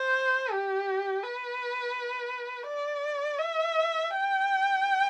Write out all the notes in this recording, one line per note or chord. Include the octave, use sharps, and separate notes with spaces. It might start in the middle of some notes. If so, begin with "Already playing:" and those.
Already playing: C5
G4
B4
D5
E5
G5